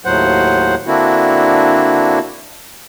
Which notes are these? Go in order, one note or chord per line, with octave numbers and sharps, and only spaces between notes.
D#2 A2 F#3 C5 F#5
D3 A#3 C4 D4 E4 F#4